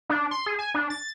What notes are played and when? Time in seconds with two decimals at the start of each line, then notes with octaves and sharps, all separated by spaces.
0.10 D4
0.31 C6
0.46 G#4
0.59 G#5
0.75 D4
0.90 A6